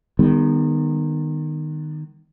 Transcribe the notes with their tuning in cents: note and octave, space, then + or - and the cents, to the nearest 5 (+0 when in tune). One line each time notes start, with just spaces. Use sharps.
D#3 -20 G3 +35 B3 +0